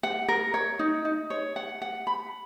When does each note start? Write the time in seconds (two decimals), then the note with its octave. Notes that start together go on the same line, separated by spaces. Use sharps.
0.03 F#5
0.28 A#4
0.54 C#5
0.79 D#4
1.05 D#4
1.30 C#5
1.56 F#5
1.82 F#5
2.07 B5